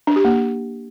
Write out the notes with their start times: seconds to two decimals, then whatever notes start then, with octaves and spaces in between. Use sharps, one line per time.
0.07 D4
0.16 G4
0.25 A#3